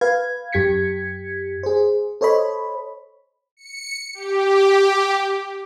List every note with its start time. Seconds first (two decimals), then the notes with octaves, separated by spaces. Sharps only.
0.01 B4 F5 G#6
0.53 F#2 G4 G#6 B6 C#7
1.63 G#4 C5
2.21 A4 C5 C#5 D#5 B5
3.57 C#7
4.14 G4